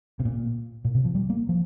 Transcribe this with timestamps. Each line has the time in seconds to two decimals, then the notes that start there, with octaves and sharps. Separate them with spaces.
0.20 C3
0.25 A#2
0.85 A#2
0.95 C3
1.05 F3
1.15 G3
1.30 A#3
1.49 F3